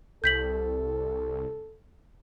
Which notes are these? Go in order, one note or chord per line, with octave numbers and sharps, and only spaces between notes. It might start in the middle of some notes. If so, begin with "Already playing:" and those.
C2 A4 G6 B6 F#7